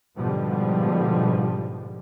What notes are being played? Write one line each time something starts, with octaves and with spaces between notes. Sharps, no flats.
G#2 B2 D3 F3 G3